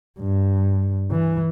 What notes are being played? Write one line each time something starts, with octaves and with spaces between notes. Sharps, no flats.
G2
E3